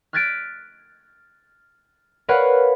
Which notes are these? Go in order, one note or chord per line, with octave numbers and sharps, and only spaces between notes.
F6 F#6 G#6 A6 B6 D7
A#4 B4 C#5 F5 F#5 B5